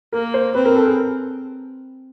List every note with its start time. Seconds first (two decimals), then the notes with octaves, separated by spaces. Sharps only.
0.13 A#3 A#4
0.34 C5
0.55 C4 B4
0.65 A#4
0.76 A4
0.87 G#4